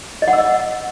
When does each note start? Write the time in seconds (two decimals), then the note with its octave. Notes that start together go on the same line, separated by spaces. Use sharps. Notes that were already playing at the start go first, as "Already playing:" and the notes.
0.22 D#5
0.28 F#5
0.33 E6
0.38 D#5